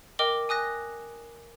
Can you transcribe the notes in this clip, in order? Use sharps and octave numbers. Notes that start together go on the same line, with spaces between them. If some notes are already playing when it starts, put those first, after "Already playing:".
A#4 D#5 G5 D6 G7
G#5 D#6 F#6 A#6